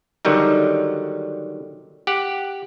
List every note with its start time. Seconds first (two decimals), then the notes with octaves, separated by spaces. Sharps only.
0.25 D3 D#3 F#3 G3 D#4
2.07 G4 F#5